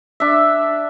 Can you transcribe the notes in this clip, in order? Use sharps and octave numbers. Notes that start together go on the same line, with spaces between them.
D4 E5